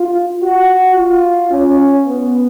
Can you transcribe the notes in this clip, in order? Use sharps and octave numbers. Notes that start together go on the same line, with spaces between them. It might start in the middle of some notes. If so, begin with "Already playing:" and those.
Already playing: F4
F#4
F4
C#4
B3